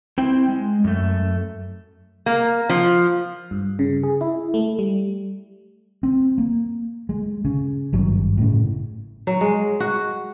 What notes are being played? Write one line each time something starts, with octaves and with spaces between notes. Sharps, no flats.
C4 E4 C5 G5
G#3
F#2 A3
A#3
F3
G2
C#3
G#4
E4
A3
G3
C4
A#3
G#3
C#3
G#1 G2 F#3
A2 C#3
F#3
G#3
F#4